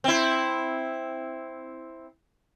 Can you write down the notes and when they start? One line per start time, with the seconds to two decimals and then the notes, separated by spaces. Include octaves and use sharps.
0.04 C4 E4